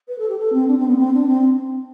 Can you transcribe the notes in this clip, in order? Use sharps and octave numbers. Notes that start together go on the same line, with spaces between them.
B4
A4
G4
A4
C4
D4
C4
B3
C4
D4
C4